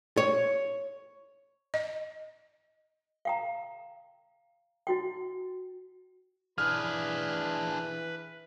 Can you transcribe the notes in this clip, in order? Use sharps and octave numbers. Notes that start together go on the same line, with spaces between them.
C#5
D#5
F5 G5 A#5
E4 F#4 G5
E3 D4 G#4 B4 F6